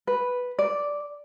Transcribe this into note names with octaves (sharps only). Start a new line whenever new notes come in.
B4
D5